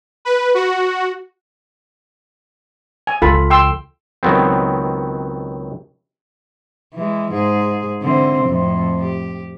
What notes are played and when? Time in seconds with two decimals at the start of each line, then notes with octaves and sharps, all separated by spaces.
0.25 B4
0.54 F#4
3.07 G#5
3.22 C#2 E3 F4 A4 B5
3.50 G5 C6 E6
4.23 C#2 D#3 F#3 B3 C4
6.94 E3 G#3
7.32 G#2 G#4
8.01 D3 E3 C4
8.44 F2 A2
9.01 G4